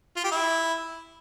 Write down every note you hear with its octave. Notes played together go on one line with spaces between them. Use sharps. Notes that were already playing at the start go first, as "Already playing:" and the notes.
F4
G4
E4